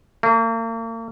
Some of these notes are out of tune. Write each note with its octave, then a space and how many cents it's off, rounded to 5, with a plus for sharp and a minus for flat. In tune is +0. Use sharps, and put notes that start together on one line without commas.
A#3 -40